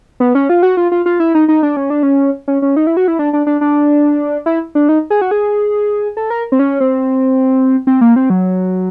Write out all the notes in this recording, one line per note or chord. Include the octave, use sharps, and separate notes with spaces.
B3
C#4
F4
F#4
F4
F4
F4
E4
D#4
D#4
D4
C#4
D4
C#4
C#4
C#4
D#4
E4
F#4
E4
D4
D4
D4
D4
E4
D4
D#4
G#4
F#4
G#4
A4
A#4
C4
C#4
C4
C4
A#3
C4
F#3